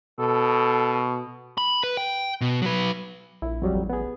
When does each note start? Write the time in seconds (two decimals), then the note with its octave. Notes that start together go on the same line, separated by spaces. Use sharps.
0.19 B2 A4
1.58 B5
1.84 B4
1.97 G5
2.41 B2
2.62 F#3 B4
3.42 A#1 E4
3.62 F2 F#3 G3
3.74 A1
3.90 B3 G#4